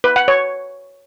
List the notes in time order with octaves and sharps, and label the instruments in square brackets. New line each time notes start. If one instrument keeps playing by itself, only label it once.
[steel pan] B4
F#5
C#5